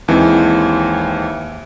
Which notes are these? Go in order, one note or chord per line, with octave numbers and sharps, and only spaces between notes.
D#2 E3 G#3 C4